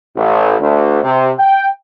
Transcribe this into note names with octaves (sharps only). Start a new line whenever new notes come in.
A1
D2
C3
G5